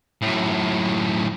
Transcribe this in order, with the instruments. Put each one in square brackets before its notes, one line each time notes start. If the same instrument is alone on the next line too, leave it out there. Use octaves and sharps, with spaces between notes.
[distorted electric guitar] F#2 A2